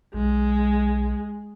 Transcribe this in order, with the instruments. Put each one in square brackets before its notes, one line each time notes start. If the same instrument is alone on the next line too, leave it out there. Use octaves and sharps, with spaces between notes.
[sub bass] B1 [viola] G#3